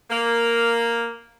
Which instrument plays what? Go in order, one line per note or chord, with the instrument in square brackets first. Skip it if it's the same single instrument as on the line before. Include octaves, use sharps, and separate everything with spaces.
[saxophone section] A#3